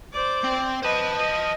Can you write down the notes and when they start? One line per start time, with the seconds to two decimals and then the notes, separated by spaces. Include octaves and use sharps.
0.13 C5 D5
0.44 C4
0.83 B4 C5 D#5 A5
1.15 D#5